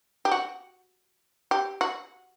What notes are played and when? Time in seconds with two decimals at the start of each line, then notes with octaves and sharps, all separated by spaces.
0.25 G4
0.31 F#4
1.51 G4
1.81 F#4